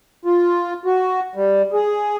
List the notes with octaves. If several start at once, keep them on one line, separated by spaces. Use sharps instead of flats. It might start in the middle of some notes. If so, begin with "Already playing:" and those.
F4
F#4
G3
G#4